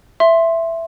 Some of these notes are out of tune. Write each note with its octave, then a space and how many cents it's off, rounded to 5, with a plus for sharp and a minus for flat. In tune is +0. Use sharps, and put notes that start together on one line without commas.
E5 +10 C6 +10